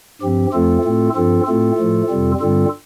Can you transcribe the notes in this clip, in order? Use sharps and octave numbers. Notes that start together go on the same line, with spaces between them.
G2 F3 C4 G4
F2 F3 A3 C4 F4 A4
A2 A3 C4
G2 F3 C4 F4 A4
A2 A3 C4 F4 A4
A2 F3 A3
F2 C3 G3 C4
G2 D3 G3 C4 F4 A4